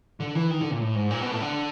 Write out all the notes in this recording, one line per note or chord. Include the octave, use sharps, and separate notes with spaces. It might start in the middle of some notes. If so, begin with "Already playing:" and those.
D3
E3
D#3
D3
A#2
A2
G#2
A#2
B2
A2
D3